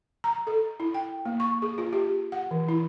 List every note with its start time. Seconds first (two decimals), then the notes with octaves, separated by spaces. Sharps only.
0.24 A#5
0.47 A4
0.80 E4
0.94 G5
1.25 A#3
1.40 C#6
1.62 G#4
1.78 F4
1.93 G4
2.32 F#5
2.51 E3
2.68 E4